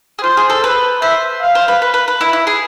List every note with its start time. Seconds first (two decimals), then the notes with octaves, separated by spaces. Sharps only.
0.19 G#4
0.23 F4 C5
0.37 G#4
0.50 A4
0.64 B4
1.02 C5 E5
1.41 F5
1.55 C5
1.68 B4
1.82 B4
1.94 B4
2.08 B4
2.21 E4
2.33 E4
2.47 G#4